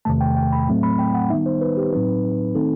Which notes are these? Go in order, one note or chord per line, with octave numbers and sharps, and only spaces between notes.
E2 C3 D#3 A3 A5
G5
G5
B5
A2 F#3 A3 C4
B5
G5
F#5
D#3 G3 B3 D#4 E5
C5
B4
G4
A2 F#3 C4 D#4 B4
D#3 A3 C4 D#4 A4